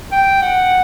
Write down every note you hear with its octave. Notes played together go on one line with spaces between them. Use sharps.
G5
F#5